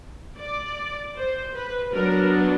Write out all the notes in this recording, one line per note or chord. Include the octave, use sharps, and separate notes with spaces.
D5
C5
B4
F#3 B3 D4 A#4